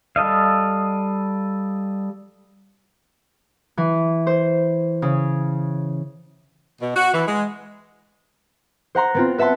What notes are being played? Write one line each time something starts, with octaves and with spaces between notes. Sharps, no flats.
G3 A4 D#5 F5
E3
C5
C#3
B2
F#4
E3
G#3
C5 F#5 A#5 C6
B3 C4 F4
B4 E5 F#5 A5 C6